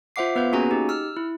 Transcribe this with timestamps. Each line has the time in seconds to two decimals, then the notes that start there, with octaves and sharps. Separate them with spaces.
0.16 F4 C5 E5 F#5 D6 C7
0.36 B3 B4 F5 G6
0.53 A#3 C#4 F#4 G#4 G#5 A#5
0.71 D#4 G4
0.89 E6 F6
1.17 E4